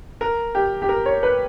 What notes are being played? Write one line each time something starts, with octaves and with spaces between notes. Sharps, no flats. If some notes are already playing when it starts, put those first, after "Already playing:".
A#4
G4
G4
A#4
C#5
B4